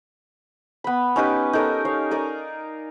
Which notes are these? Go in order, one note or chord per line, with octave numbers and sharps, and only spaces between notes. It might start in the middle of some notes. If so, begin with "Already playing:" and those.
B3 B5
C#4 D#4 G4 B4
D#4 A4 A#4 C#5
C#5 F5
D#4 A#4 D5 G#5